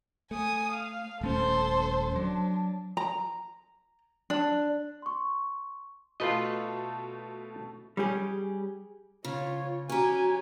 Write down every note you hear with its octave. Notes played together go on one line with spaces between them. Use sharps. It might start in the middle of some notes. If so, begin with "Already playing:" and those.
A3 G#5 D#6
F5
D#1 A3 C#4 A4 C5
F#3 D4
A#5
D4
C6 C#6
B2 A3 F4 A4 B4 D#5
G3 C#4 G4 G#4
C#3 F4 C#5
C#4 F#4 G4 G#5 A#5